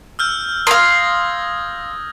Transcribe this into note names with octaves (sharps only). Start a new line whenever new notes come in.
E6 F6 G6
F5 C6 D#6 G#6 A#6